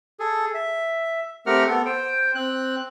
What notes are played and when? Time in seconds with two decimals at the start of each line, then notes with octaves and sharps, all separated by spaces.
0.20 G#4 A4
0.54 E5
1.46 A3 C4 G4 A#4 F#5 F6
1.68 B3 A4
1.86 C5 G5
2.35 C4 F#6